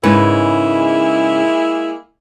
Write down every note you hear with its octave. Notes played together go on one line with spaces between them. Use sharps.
G#2 C#3 G#3 A#3 E4 B4